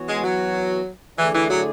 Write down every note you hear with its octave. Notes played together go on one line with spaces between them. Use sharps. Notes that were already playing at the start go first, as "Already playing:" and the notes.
Already playing: E3 B3 F#4 C#5
G#3
F#3
D3 E3 A3 E4 G#4 D5
E3
F#3